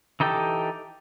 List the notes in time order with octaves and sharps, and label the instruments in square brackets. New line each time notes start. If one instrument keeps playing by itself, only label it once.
[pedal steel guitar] E3 D#4 G4 A4 G5